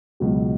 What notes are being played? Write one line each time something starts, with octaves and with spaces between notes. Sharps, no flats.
C#2 B2 F#3